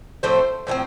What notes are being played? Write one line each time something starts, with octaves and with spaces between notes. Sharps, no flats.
A2 F3 A3 C4 C5
A2 F3 A3 C4